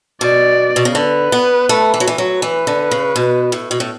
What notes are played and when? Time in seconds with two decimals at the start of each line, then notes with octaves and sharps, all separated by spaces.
0.21 B2 D5
0.76 B2
0.85 C#3
0.95 D3 B4
1.32 B3
1.69 A3
1.94 E3
2.00 F#3
2.07 E3
2.18 F#3
2.42 E3 B4
2.67 D3
2.91 C#3
3.16 B2
3.52 A2
3.71 B2
3.80 A2